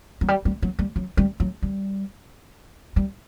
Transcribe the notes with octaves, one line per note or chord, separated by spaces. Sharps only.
F#3
G3
G3
F#3
G3
F#3
G3
F#3
G3
G3